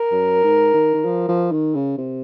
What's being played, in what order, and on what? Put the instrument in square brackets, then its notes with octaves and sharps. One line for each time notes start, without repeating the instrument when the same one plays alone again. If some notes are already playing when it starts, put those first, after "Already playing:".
Already playing: [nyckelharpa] A#4
[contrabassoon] F#2
G#2
D#3
D#3
F3
F3
D#3
C#3
C3